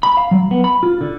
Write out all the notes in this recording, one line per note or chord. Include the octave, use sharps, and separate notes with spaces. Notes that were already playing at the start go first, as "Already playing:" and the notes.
B5
F5
F#3
B3
B5
F4
D3